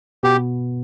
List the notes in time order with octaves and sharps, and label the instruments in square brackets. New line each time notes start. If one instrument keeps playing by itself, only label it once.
[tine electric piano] B2 B3 [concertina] G4